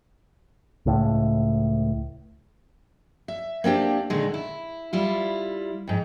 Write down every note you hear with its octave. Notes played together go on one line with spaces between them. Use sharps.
C#2 A2
E5
A#3 C4 D4 G4
A#2 D3 D#3 G#3
E4
G3 E4 F4
F2 G#2